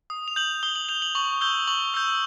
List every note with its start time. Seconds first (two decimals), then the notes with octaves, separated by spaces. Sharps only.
0.10 D#6
0.28 F7
0.36 G6 F#7
0.63 D#6 G7
0.76 F#7
0.89 G6 F7
1.02 F#7
1.15 C#6 F#7
1.41 E6 G6 G7
1.67 C#6 F#7
1.94 E6 G6